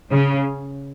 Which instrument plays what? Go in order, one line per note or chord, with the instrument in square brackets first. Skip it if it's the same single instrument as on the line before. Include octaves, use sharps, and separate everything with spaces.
[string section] C#3